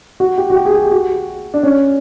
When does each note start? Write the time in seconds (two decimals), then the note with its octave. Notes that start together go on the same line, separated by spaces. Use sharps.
0.20 F#4
0.38 G4
0.50 F#4
0.55 G4
0.65 G#4
0.73 G4
0.91 F#4
1.54 D4
1.63 C#4